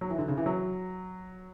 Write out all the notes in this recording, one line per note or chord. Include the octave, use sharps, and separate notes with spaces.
F#3
E3
D3
C#3
E3
F#3